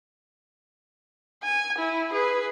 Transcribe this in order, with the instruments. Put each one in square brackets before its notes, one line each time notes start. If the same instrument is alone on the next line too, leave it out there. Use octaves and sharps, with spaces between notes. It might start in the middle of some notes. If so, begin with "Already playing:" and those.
[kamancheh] G#5
E4
G#4 B4